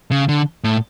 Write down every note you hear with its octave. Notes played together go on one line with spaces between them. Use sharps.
C#3
D3
A2